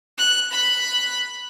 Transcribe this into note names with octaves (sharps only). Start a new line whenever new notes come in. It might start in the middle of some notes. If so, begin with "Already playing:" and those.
F#6
B5 F#6